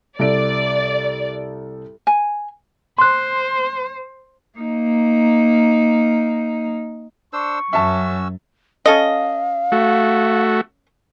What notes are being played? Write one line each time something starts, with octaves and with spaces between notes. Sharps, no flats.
C2 A4 D5 D7
G#5
C5 C6 F#6
A#3 D#4
D4 C5 C#6 E6
F#2 C#4 F#4 E5 A5 E6
C#4 A4 D#5 F5
A3 F#4